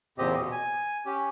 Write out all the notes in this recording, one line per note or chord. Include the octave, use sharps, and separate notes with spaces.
E2 A#2 C#3 C4 G4 D#5
B2
G#5
C#4 G4